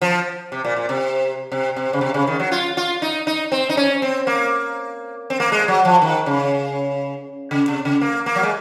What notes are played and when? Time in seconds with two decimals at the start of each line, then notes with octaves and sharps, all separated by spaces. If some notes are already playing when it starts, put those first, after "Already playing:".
0.02 F3
0.52 C3
0.65 A#2
0.76 A#2
0.89 C3
1.52 C3
1.76 C3
1.93 C#3
2.01 C3
2.14 C#3
2.27 D#3
2.40 F#3
2.52 F4
2.77 F4
3.02 D#4
3.27 D#4
3.52 C4
3.69 D#4
3.77 C#4
4.02 C4
4.27 A#3
5.30 C4
5.40 A#3
5.52 G#3
5.68 F#3
5.85 F3
6.02 D#3
6.26 C#3
7.51 C#3
7.68 C3
7.85 C#3
8.01 A#3
8.26 A#3
8.36 F#3
8.43 G#3